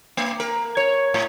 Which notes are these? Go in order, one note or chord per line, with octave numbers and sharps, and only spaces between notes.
A#3
A#4
C#5
A2